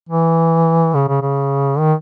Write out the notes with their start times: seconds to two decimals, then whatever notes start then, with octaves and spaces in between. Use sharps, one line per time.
0.09 E3
0.94 C#3
1.08 C#3
1.21 C#3
1.79 D#3